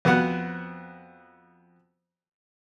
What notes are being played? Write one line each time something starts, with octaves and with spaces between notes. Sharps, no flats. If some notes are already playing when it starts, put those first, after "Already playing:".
F2 B3 F#4 F#5